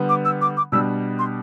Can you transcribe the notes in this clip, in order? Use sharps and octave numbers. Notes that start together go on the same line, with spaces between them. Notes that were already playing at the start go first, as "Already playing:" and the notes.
Already playing: D3 G3 B3
D6
E6
D6
D6
B2 G3 D4 E6
C6